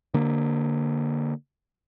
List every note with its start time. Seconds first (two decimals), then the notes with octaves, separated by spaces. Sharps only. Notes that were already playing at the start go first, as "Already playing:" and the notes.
0.14 D3 A#3